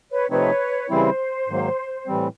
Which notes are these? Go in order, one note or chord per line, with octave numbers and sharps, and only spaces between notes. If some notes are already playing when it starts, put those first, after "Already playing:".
B4 C#5
C3 F3 A3 C4 D#4 B4 C#5
C#3 E3 G3 C4 E4 C5
G#2 D#3 F#3 A#3
A2 E3 G3 C4